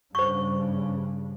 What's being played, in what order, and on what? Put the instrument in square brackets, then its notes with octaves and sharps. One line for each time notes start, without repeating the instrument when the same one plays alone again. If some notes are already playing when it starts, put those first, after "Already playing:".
[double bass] G2 C#3 [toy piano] C5 C#6